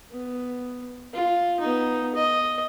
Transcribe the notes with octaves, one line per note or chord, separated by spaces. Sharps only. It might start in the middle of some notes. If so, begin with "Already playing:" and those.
B3
F4
B3 D#4
D#5